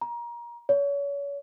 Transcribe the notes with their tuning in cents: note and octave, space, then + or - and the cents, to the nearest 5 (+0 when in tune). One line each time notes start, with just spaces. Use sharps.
A#5 +25
C#5 +35